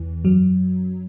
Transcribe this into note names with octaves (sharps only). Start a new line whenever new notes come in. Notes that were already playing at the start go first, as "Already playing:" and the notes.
Already playing: E2 E3
F#2 F#3